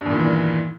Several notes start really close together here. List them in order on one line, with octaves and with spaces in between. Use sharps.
G2 E2 A#2 D#3 E3